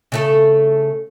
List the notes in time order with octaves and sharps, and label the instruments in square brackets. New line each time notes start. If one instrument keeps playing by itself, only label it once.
[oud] C#3 A3 A4